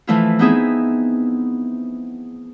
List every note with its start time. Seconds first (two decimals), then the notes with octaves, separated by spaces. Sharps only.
0.07 E3 F3 A3 E4 F4
0.39 B3 C4 D#4 E4 G#4 E5